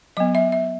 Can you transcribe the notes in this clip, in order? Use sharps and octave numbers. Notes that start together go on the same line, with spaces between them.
F#3 B3 D#5
E5
E5